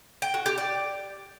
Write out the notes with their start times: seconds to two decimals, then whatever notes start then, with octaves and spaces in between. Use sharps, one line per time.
0.22 G5
0.34 F#4
0.46 G4
0.58 D5